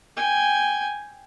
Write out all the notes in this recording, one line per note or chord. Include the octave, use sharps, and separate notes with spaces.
G5 G#5